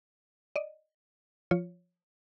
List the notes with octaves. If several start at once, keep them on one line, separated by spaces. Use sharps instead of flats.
D5 D#5
F3 F4 C#5